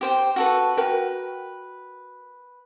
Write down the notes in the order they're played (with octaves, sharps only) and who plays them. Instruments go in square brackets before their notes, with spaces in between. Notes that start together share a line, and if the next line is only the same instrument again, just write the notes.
[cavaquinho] G4 C5 G5
F#4 A4 B4
[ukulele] F#4 A#4 G5 [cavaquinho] B4